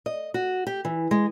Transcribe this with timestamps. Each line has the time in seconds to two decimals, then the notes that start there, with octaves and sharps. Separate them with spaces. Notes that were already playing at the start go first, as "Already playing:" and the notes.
0.06 D#5
0.34 F#4
0.67 G4
0.85 E3
1.11 G#3